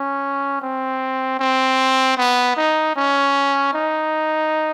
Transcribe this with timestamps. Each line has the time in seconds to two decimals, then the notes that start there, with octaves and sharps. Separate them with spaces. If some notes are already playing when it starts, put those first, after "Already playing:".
Already playing: C#4
0.62 C4
1.39 C4
2.17 B3
2.57 D#4
2.96 C#4
3.74 D#4